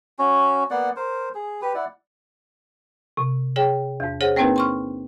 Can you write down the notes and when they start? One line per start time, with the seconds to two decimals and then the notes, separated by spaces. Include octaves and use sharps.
0.19 C#4 F#4
0.70 A#3 B3 D5 F#5
0.96 A#4 C5
1.34 G#4
1.61 G4 B4
1.75 E4 D5 F#5
3.17 C3
3.56 G#4 C#5 G5
4.00 E2 G#2
4.21 G#4 C5 C#5 F#5
4.36 A#3 C4 D4 D#4 A#4 B4
4.56 C6 C#6 F6